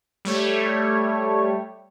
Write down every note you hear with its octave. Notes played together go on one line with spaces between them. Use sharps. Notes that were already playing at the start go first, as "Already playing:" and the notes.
G3 A3 C#5